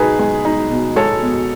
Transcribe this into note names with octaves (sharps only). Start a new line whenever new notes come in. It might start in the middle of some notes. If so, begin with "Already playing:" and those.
Already playing: B2 D#4 G#4 B4
G#3
D#4
B2
G#3 A4 C#5
B2